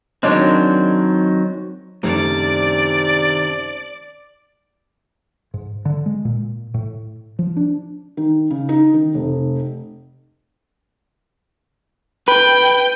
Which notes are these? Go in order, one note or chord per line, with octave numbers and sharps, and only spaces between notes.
D#3 F#3 G#3 C4 D4 C#5
F#2 C3 D#3 F3 A3 C#4 D4 D5
G#2
D3
G#3
A#2
A2
F3
D4
D#3
C#3
D#4
D#3
F1
B4 G5